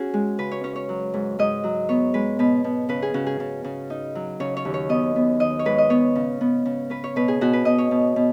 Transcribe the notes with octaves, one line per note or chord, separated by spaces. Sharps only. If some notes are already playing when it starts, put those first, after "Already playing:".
Already playing: C#4 F#4 G#4
G#3
C#3 B4
C#5
C#4 C#5
C#5
F#3
G#2
G#2 D#5
F#3
B3 C#5
G#3 B4
B2 B4
B2
C#3 B4
G#4
C#3 F#4
G#4
C#3
C#3
D#4
F#3
C#3 C#5
C#5
D#2
C#5
B3 D#5
B3
D#3 D#5
C#5
G#2 B4
D#5
B3 C#5
C#3
B3
C#3
C#4 B4
C#5
B2 B4
G#4
B2 F#4
B4
B2 D#5
C#5
B2
B2